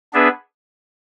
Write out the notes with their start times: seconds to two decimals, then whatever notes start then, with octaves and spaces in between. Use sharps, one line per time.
0.13 B3 D4 G#4 B4 E5